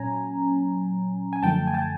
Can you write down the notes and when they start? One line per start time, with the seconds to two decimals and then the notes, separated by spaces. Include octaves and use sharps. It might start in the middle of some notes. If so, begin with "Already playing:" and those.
Already playing: A#2 F#3 C#4 G#5 A#5
1.33 G#5
1.43 F#2 D3 F3 A3 G5 A5
1.67 G#5
1.74 G5 A5